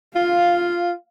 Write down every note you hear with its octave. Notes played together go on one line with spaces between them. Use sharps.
F4 F5